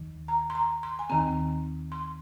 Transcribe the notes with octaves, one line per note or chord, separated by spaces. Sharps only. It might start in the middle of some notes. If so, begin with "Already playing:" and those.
Already playing: D#2 D#3
A#5
C6
A#5
C6
G#5
D#2 D#3 C4 A#5
C6